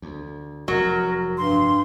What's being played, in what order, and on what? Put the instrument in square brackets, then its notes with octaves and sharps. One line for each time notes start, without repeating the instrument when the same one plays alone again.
[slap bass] D2
[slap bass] F1 E2 [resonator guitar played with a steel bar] F#3 [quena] A#4
[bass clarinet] G2 [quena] C6